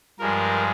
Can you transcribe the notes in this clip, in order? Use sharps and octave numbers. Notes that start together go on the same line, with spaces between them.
G2 F3 G#3 A#4